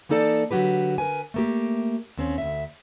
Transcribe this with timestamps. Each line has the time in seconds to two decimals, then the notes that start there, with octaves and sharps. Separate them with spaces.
0.09 E3 A#3 D#4 A4 D5 A5
0.51 D3 F#3 F#4 G4 B4
0.98 A#4 B4 G#5
1.34 A3 A#3 G4
2.17 D#2 C4 C#4
2.38 D2 E5